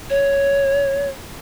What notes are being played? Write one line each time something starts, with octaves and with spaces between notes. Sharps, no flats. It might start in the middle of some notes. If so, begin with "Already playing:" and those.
C#5